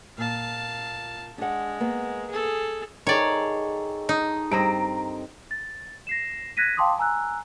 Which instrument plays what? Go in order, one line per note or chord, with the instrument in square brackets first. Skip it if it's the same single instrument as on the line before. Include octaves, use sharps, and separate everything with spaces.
[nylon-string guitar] A#2 [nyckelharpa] F5 A5
[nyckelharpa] G#3 [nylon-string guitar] D4 F#5
[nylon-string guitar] A#3 B3
[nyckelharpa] G#4 A4
[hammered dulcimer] D#3 G#4 A4 [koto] C#5 D5
[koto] D#4
[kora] G2 C4 D#5 [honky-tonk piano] A#5 D7
[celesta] A6
A#6 C7 E7
F#6 G#6 A#6 B6 D#7
F5 G5 A5 C6 D6 D#6
G#5 A#5 E6 F#6